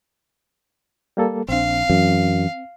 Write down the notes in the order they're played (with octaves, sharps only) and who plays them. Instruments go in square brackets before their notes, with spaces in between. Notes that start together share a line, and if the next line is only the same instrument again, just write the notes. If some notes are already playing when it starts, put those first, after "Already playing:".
[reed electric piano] G3 A#3 A4
[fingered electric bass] A#1 D4 [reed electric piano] C4 [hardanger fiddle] F5
[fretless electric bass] F#2 [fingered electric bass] E3